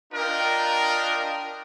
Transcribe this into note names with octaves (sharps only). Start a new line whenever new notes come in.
D4 F4 A#4 D#5 G5